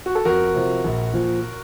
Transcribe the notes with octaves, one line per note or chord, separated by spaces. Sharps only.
F#4
A4
F2 F#4 A#4
C3 F3
A#1
A#2 F3